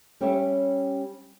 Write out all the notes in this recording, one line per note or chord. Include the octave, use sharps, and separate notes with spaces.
G3 C#4 G4 C#5 E5